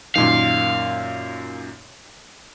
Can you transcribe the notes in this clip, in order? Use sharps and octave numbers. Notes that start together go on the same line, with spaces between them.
F#2 A#2 D#3 F5